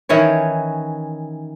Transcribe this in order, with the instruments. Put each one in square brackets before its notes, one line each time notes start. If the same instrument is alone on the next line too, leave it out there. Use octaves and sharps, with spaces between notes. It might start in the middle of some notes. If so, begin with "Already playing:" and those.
[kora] D#3 E3 C#4 C#5